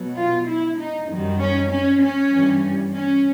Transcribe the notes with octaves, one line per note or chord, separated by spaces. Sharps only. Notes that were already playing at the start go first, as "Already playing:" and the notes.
Already playing: B2 F#3
F4
E4
D#4
F#2 D#3 G3
C#4
C#4
C#4
G2 E3 G3
C#4